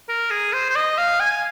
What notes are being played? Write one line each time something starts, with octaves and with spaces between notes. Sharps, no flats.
A#4
G#4
C5
C5
D#5
F5
G#5